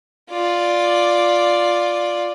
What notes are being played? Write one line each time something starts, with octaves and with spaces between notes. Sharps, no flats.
F4 D5